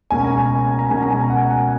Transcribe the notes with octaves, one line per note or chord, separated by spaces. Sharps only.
C#2 B2 A#3 C#4 G#5
A#5
G#5
A#5
C#2 B2 A#3 C#4 G#5
A#5
G#5
F#5
F#5